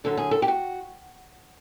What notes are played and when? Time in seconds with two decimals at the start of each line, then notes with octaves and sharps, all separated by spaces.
0.04 F#2 D3 F#3 A4
0.17 G#4
0.31 A4
0.42 G4
0.48 F#4